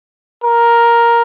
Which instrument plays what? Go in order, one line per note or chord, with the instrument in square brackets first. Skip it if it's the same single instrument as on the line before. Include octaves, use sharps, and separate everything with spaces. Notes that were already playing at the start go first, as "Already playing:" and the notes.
[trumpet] A#4